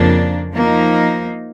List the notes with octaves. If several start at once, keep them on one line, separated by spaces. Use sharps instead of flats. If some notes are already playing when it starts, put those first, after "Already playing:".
Already playing: F2 C#3 F3 A#3 D4
F3 A#3 D#4